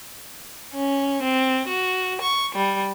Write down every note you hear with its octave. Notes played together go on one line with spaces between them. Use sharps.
C#4
C4
F#4
C#6
G3